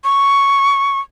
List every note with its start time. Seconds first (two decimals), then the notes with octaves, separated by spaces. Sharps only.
0.04 C#6